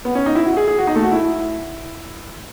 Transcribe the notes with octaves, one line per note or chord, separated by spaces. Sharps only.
B3
C#4
D#4
E4
F#4
G#4
G#4
F#4
D#4
A3
F#4
E4